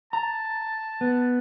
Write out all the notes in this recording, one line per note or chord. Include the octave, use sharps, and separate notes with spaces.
A5 A#5
B3